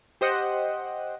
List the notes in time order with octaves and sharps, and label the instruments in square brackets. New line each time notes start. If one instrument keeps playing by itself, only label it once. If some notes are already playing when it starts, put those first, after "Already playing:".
[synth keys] G4 C5 D#5 F#5